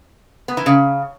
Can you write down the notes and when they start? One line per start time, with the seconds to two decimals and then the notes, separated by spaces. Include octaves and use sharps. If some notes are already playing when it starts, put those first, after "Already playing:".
0.48 B3
0.57 E3
0.66 C#3